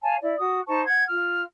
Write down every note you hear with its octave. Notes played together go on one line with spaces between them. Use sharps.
C#5 F5 G#5 A5
E4 D5
F#4 D#6
D#4 C5 A5 C#6
F#5 G#6
F4 F6